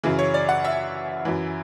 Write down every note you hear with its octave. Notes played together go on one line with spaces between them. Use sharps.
F#2 C#3 E3
C#5
D5
F#5
E5
F#2 E3